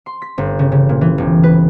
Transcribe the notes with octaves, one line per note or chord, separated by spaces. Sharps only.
C6
B6
G1
C#3
C#3
A#2
E3
E1
B4